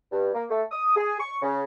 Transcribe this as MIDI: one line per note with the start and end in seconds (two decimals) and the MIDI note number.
0.11 0.29 43
0.34 0.44 58
0.50 0.63 57
0.71 0.94 87
0.96 1.18 68
1.20 1.36 85
1.42 1.63 49